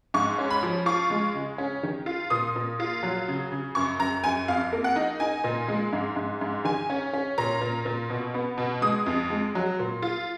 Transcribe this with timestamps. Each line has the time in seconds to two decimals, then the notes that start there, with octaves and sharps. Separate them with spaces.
0.14 G#2 C#6
0.38 C#4
0.50 B5
0.63 F3
0.86 F4 C#6
1.10 G#3
1.35 C#3
1.58 C#4
1.83 D#3
2.06 F4
2.30 A#2 D#6
2.56 A#2
2.80 F4
3.03 F#3
3.28 C#3
3.52 C#3
3.75 F#2 C#6
3.99 F#2 A#5
4.24 F#2 G#5
4.48 F2 F5
4.73 A#3
4.84 F#5
4.96 D#4
5.20 D#4 G#5
5.44 A#2
5.68 G#3
5.93 G#2
6.16 G#2
6.41 G#2
6.65 D#3 G#5
6.90 C#4
7.13 C#4
7.38 A#2 A#5
7.61 A#2
7.85 A#2
8.10 B2
8.34 B3
8.58 B2
8.82 G#3 D#6
9.06 F2
9.30 G#3
9.55 F#3
9.79 A#2
10.02 F4